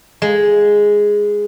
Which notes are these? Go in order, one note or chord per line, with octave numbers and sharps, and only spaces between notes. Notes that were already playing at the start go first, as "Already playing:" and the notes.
G#3